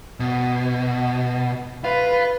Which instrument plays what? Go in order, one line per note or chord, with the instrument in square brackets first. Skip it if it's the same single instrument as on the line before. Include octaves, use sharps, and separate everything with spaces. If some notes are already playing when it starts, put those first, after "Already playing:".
[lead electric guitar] B2
[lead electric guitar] F4 F5 [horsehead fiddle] B4